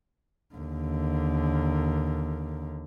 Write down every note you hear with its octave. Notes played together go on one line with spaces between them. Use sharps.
D#2 D3